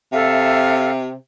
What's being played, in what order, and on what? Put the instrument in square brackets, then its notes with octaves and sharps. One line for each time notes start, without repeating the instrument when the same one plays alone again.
[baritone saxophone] C3 [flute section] A4 E5 F5